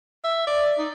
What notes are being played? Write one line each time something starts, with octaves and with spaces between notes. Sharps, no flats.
E5
D5
D#4